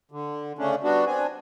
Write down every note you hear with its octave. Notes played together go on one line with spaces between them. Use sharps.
D3
C#3 A3 C#4 D4
G3 B3 D4 F#4
C4 D4 G#5